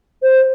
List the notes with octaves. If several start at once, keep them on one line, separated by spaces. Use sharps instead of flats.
C5